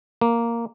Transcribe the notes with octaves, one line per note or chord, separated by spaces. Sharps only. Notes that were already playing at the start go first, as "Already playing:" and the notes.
A#3